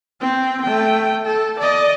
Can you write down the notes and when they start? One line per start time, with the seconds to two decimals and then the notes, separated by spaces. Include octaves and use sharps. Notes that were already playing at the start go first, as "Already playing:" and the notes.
0.20 C4 G5
0.62 A3 G5
1.25 A4
1.59 D5 D#5